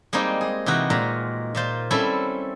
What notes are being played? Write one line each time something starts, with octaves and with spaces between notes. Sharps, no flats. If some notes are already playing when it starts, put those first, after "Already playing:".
G3 G#3 A#3 C4 D#4
G#4
C3 E3 D#4 F#4
A#2 G#3 A#4
A#2 F4 C5
G3 C4 C#4 E4 A4